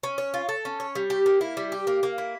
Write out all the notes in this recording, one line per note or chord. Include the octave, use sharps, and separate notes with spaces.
C#4
C#5
F4
A4
C#4
C#5
G3
G4
A#3
E4
G3
G4
A#3
A#3
E4